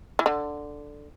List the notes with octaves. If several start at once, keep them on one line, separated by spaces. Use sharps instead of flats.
E3
D3